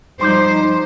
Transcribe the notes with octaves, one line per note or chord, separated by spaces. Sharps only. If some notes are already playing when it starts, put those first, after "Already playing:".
F3 G3 D#4 C5 C6 D6 G6